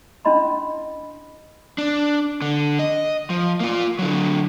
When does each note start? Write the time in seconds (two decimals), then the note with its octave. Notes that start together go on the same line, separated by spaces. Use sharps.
0.25 C#4 D4 E4 D#5 B5 C6
1.78 D4
2.42 D3
2.79 D#5
3.30 F3
3.60 A#3 F4
3.99 D3 F#3